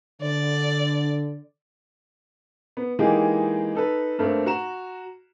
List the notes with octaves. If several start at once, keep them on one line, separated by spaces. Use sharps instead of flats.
D3 D5
B3
E3 G#3 A#3 D#4 G4 G#4
D#4 A4 B4
G2 A3 A#3 C4
F#4 A#5 E7